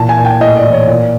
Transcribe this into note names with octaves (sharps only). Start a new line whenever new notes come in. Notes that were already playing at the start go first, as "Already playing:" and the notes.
Already playing: A#2 E3 A5
G#5
A#2
G5
A2 D#5
D5
E3
C#5
A#2 D5